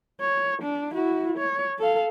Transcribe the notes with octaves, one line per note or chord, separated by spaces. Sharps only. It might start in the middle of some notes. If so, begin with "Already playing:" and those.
C#5
D4
E4 F#4
C#5
A4 F5